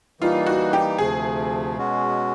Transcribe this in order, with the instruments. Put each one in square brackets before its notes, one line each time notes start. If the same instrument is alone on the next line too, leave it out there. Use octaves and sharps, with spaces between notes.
[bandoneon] E3 G3 A#3 D#4 [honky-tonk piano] F4
[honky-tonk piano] F#4
G4
[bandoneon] D2 C3 F3 A3 [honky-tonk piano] G#4
[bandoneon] B2 G#3 C#4 F#4